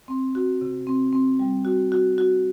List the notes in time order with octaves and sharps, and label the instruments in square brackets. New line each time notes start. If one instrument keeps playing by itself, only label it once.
[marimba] C4
F#4
C3
C4
C4
G3
F#4
F#4
F#4